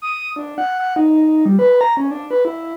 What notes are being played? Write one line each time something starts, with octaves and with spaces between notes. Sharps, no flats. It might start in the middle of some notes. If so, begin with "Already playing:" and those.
D#6
D4
F#5
F#5
D#4
G3
B4
A#5
C#4
D4
B4
E4